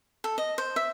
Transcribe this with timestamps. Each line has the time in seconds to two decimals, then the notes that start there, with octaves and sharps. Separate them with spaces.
0.24 A4
0.38 D#5
0.58 C5
0.76 E5